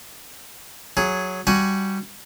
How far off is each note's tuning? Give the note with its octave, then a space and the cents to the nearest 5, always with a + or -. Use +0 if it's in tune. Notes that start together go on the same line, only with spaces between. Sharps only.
F#3 +0 G#4 +0
G3 -5 F#4 +0 G#5 +10